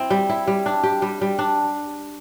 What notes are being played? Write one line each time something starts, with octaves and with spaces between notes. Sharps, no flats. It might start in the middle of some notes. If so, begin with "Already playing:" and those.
Already playing: C4 E4
G3
E4
G3
D4
G4
G3
G3
D4